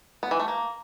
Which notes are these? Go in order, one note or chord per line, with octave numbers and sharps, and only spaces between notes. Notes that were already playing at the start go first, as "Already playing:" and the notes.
B3
E3
A3
A#3